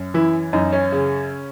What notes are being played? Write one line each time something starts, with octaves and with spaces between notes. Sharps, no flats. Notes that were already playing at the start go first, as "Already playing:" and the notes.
Already playing: F#2
E3 E4
F#2 D#4
C#4
C#3